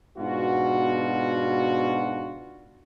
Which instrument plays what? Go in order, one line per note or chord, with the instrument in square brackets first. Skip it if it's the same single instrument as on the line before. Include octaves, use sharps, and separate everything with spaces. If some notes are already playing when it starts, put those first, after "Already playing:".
[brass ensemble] G#2 B2 D4 F4 F#4